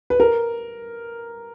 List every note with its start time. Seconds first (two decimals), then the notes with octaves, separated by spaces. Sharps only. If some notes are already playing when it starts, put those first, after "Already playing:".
0.10 B4
0.20 A#4